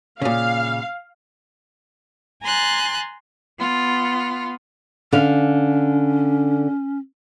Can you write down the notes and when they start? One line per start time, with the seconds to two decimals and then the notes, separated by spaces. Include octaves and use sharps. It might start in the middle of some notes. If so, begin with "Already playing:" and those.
0.22 A#2 C#3 F5
2.43 G#5 A#5 C6 F#6 A6
3.58 B3 F4
5.13 D3 C#4 F5